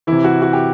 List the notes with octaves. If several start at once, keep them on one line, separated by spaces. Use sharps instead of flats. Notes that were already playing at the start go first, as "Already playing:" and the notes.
C3 E3 E4
F#4
F#4
G4